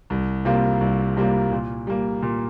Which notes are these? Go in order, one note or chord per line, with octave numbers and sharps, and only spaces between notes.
C2
C3 G3 A#3 F4
C2
C3 G3 A#3 F4
A#2
G3 A#3
A#2